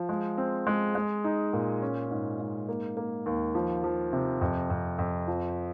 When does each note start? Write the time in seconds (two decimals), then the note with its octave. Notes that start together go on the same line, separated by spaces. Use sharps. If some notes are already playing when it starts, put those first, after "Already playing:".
Already playing: F3
0.09 G#3
0.38 C4
0.67 G#3
0.95 G#3
1.24 D#4
1.53 A#2
1.82 C#4
2.11 G#2
2.40 G#2
2.69 A#3
2.97 A#3
3.26 D#2
3.55 F3
3.84 F3
4.13 C3
4.41 F2
4.70 F2
4.99 F2
5.28 F3